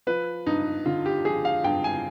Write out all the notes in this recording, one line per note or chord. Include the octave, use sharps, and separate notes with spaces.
F3 B4
G2 D#4
D3 F4
G4
F3 G#4
F5
G2 G5
G#5